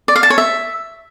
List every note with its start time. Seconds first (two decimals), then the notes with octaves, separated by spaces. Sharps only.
0.08 D5
0.16 F5
0.23 A5
0.30 C#5
0.38 E5